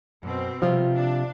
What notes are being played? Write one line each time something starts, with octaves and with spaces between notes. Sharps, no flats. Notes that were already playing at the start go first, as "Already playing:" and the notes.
F#2 B2 C4
C3 F3 G3 F4
D4